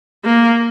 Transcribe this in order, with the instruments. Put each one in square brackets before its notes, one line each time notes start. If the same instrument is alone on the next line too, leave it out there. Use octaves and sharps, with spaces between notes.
[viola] A#3